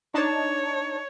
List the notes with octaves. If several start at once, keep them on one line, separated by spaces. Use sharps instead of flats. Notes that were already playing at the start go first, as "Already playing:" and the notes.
D4 D#4 C#5 A5